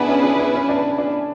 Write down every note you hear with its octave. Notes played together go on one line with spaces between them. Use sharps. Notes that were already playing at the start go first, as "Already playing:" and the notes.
Already playing: B3 D4 E4 G#4 B4
C#4
D4
C#4
C#4
D4
D4